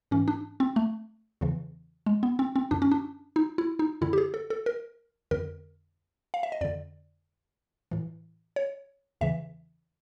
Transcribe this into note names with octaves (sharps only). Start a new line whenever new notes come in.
G#2 E3 C#4
D4
C4
A3
E2 C#3 E3
G#3
B3
C4
C4
F#2 D3 D4
C#4
D4
D#4
E4
D#4
F#2 D3 E4
G4
G#4
A4
A4
A#4
F2 D3 A#4
F5
E5
D#5
F2 D3 D5
A2 E3
C#5
E2 C#3 E3 E5